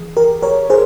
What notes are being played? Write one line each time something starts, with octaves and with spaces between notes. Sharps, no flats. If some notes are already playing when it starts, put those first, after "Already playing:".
Already playing: E3 G#4
G4 A#4
A#4 C#5
G#4 C5